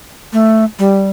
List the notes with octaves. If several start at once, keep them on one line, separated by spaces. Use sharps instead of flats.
A3
G3